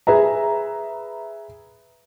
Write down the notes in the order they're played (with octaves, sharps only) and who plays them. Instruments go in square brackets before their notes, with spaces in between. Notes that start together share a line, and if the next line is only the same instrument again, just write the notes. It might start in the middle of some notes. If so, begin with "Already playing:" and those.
[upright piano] G#4 B4 E5 A#5